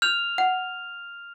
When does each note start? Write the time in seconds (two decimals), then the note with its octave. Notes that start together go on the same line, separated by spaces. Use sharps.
0.02 F6 G6 F7
0.38 F#5